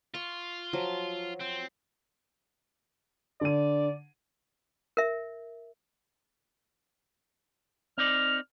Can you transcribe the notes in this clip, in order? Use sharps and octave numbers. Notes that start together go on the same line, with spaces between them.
F4 C#6
F3 F#3
C4
D3 D5 D#7
A#4 E5
C4 D#4 D5 F6